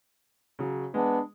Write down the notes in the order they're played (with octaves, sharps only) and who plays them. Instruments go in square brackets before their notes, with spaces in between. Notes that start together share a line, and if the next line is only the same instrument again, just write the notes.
[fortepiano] C#3 F#3
[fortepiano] G#3 [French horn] B3 [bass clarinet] D4